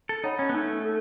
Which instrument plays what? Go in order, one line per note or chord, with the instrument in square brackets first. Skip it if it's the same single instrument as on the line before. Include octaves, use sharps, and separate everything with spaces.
[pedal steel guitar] A4
[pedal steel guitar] D#4 [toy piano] C#5 F#5 B5
[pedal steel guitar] C#4
B3
[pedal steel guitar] A3 [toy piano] D#4
[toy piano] A4